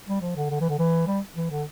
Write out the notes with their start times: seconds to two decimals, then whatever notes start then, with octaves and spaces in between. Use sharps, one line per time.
0.08 G3
0.22 F3
0.36 D3
0.50 D3
0.60 E3
0.69 D3
0.79 E3
1.07 G3
1.36 E3
1.51 D3